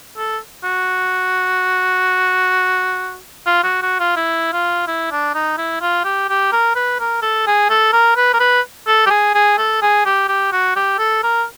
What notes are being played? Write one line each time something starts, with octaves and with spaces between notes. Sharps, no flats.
A4
F#4
F4
F#4
F#4
F4
E4
F4
E4
D4
D#4
E4
F4
G4
G4
A#4
B4
A#4
A4
G#4
A4
A#4
B4
A#4
B4
A4
G4
G#4
G#4
A4
G#4
G4
G4
F#4
G4
A4
A#4